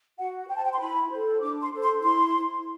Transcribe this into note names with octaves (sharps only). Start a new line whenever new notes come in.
F#4 F#5
C5 G5
A5
G5
C6
E4 B5
A4 C5
D4 D6
C6
A4 C5
C6
E4 C6